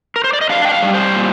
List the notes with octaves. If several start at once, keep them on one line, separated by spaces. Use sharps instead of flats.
A#4
C5
D5
D#5
D4 F5
G5
F5
G3
C5
A#2